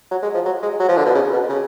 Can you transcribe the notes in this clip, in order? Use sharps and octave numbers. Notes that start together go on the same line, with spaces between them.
F#3
G#3
F3
F#3
G#3
F#3
F3
D3
B2
C#3
B2
C#3